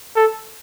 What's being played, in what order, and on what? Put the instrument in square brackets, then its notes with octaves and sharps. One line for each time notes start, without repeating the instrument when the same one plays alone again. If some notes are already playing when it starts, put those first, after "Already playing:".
[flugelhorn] A4